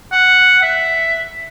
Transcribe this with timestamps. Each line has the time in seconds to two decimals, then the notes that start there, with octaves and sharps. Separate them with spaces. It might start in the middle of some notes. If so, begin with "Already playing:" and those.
0.12 F#5
0.63 E5